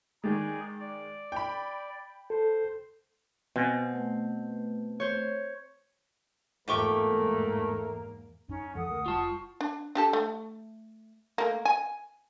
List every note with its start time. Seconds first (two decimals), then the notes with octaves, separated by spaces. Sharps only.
0.24 D#3 G#3 D#4 G#4 D5
0.80 D5
1.32 G5 B5
2.30 A4 C5
3.56 B2 C4 G#5
3.92 A3 B4
5.00 C5 C#5
6.68 E2 G#2 F3 A3 A#3 G4 A#4 C#6
8.49 F#2 C#4 D#4
8.75 F#2 E3 F3 A4 F#5 D#6
8.89 D2 A3 A#4
9.06 F1 B2 G3 F4 A5 C#6
9.61 D4
9.95 D4 G4 A4
10.13 A3
11.38 A3 A#3
11.65 G#5